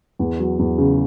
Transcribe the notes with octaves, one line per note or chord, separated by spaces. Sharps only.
E2
F#3
E2
C#3